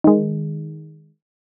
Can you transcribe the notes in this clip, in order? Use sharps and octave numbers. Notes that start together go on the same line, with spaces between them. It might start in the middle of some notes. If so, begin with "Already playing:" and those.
D#3 G#3